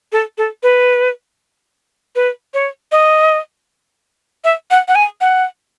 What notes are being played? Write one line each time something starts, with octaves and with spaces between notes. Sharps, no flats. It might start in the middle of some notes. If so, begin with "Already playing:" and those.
A4
A4
B4
B4
C#5
D#5
E5
F#5
F#5
G#5
F#5